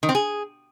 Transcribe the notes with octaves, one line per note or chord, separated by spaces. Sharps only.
D#3
C4
G#4